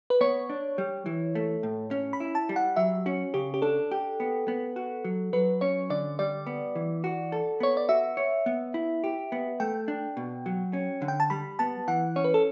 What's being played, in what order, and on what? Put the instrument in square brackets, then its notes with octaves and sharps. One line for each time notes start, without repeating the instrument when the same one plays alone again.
[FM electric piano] B4
[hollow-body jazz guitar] B3 [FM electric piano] C#5
[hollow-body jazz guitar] D4
G3
E3
A3
A2
C#4
[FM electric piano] B5
[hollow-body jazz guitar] E4
[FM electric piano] A5
[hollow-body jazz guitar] G3
[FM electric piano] F#5
[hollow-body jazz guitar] F#3 [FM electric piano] E5
[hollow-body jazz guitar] C#4 [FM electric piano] F#4
[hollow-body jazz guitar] C#3 [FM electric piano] G4
[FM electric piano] G4
[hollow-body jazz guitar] D4 [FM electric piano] A4
[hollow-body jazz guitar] G4
B3
B3
F#4
F#3
[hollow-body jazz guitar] F#3 [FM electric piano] B4
[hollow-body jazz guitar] C#4 [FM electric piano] C#5
[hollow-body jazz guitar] D3 [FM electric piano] D5
[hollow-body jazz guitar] G3 [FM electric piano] D5
[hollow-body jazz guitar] B3
E3
F#4
A4
[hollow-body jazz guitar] B3 [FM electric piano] C#5
[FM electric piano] D5
[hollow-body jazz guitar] F#4 [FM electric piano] E5
[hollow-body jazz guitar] C#5
B3
E4
G4
B3
[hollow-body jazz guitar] A3 [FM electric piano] G5
[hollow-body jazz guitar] D4
B2
F#3
C#4
D3
[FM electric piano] G5
A5
[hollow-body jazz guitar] G3 [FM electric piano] B5
[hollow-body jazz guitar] B3 [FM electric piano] A5
[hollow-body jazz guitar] E3 [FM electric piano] F#5
[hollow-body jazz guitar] C#4 [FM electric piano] C#5
[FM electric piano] B4
A4